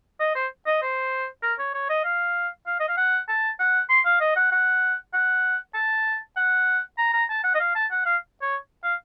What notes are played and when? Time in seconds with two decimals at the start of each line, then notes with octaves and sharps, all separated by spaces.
0.20 D#5
0.35 C5
0.67 D#5
0.82 C5
1.43 A#4
1.59 C#5
1.74 C#5
1.89 D#5
2.04 F5
2.67 F5
2.80 D#5
2.88 F5
2.97 F#5
3.29 A5
3.59 F#5
3.89 C6
4.05 F5
4.20 D#5
4.36 F#5
4.52 F#5
5.13 F#5
5.74 A5
6.36 F#5
6.98 A#5
7.13 A#5
7.29 A5
7.44 F#5
7.55 D#5
7.60 F5
7.75 A5
7.91 F#5
8.05 F5
8.42 C#5
8.83 F5